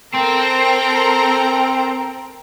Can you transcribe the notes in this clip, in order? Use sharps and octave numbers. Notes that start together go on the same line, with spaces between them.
C4 A4 A#4 A#5